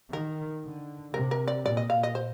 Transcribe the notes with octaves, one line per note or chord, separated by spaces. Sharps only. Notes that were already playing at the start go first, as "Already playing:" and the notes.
D#3 A#4
D3
C3 A#4
A#4
D5
A#2 D5
D#5
F5
D#5
C5